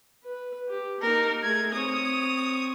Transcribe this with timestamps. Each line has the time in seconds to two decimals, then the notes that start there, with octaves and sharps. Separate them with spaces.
0.23 B4
0.69 G4
1.02 A#3 D#4 A#4
1.43 A3 G#4 G#6
1.74 C4 C#5 D#6